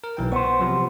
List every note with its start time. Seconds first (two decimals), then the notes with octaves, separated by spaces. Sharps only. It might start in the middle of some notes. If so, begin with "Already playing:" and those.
0.04 A#4
0.17 B1 E3 G5
0.32 B3 C5 C#6
0.60 C3 F3 F#3